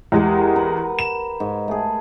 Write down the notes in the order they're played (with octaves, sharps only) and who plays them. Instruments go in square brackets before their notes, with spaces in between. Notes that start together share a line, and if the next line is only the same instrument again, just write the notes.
[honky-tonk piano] E2 G#3 [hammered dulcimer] G4 A#4 F#5
[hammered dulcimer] A#4 B4 F#5
[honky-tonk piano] E7
[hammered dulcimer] G#2
A3 G#4